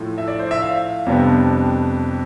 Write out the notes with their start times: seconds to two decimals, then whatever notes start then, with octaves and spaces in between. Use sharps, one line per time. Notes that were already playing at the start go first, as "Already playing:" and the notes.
Already playing: A2 F3 A3
0.18 E5
0.28 D5
0.39 C5
0.51 E5
0.62 F5
1.06 F2 C3 G3 B3 D4